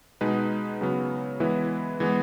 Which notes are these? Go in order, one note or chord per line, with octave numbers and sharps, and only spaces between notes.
B2 G#3 D#4 G#4 B4
C#3 F#3 B3
E3 G#3 B3 E4 B4
E3 G#3 B3